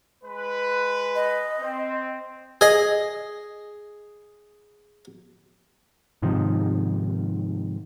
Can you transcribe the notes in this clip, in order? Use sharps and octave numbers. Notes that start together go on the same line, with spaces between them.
G#3 B4
D#5
C4
G#4 D#5
G#2 C3 D#3 F3